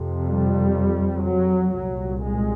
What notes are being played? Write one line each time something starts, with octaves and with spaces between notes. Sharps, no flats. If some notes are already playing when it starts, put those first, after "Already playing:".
Already playing: F2 C3
G3
F#3
C2 A#2 F#3
G#3